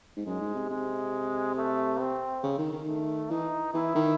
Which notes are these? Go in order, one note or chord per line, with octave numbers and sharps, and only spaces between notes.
G#2
F#2 G#3
G#2
C3
C3 G#3
A3
C4
C#3
D#3
D#3
A3
E3 D#4
E3 E4
D#3